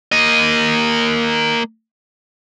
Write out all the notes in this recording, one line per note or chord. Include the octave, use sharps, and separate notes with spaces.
A#3 D#5